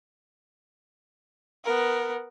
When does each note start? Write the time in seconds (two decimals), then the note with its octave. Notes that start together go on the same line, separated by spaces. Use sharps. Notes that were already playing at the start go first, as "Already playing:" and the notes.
1.64 B3 A#4